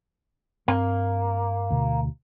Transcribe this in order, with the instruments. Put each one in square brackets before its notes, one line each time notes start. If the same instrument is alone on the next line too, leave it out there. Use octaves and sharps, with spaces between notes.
[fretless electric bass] G2 C4 [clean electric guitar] A#3
[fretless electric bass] D2 B2